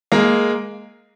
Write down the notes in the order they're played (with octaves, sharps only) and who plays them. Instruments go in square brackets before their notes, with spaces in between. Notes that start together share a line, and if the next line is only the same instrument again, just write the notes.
[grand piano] G#3 A#3